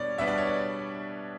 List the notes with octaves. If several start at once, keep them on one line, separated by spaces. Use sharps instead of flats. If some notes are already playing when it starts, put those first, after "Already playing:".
Already playing: B2 G3 B3 D4 C#5 D5
B2 G3 B3 D4 E5
D5
C#5
D5